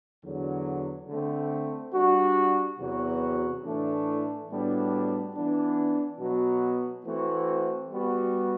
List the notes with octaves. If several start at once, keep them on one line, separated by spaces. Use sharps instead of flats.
E2 D3 F#3
D3 A3 C4
G3 D4 F#4
E2 C3 F#3 B3 F#4
A2 E3 A3 D4
A2 G3 B3 D4 F#4
E3 B3 D4
B2 F#3 B3 F#4
E3 A3 C4 F#4
G3 B3 F#4